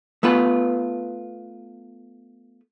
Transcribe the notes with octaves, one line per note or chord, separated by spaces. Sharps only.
A3 B3 F4 B4